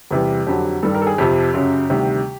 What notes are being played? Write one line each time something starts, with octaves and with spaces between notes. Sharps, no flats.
E2 C3 E3 G3
F2 D3 F#3 G4
G2 D#3 G3 A4
A#4
A4
G#4
F2 C3 F3 G4
F#2 C#3 F#3
D2 C3 D#3 G3